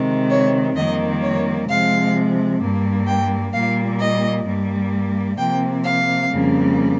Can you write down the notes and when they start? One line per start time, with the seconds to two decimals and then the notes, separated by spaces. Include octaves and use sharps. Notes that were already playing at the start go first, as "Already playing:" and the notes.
Already playing: C3 D#3 G#3
0.30 C#5
0.76 F2 D#3 G3 A#3 D#5
1.22 C#5
1.69 C3 F3 G#3 F5
2.61 G2 G3 A#3
3.07 G5
3.53 A#2 G3 A#3 F5
3.99 D#5
4.46 G2 G3 A#3
5.38 C3 F3 A#3 G5
5.84 F5
6.31 F2 C#3 G3 A#3